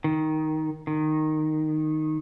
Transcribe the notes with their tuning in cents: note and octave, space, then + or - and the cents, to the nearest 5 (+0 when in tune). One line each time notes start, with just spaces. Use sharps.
D#3 +5
D#3 -5